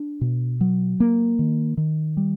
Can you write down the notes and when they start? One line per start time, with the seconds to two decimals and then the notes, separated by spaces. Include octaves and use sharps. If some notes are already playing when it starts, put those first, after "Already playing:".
Already playing: D4
0.21 B2
0.61 F#3
1.00 A#3
1.39 D#3
1.77 D#3
2.17 G3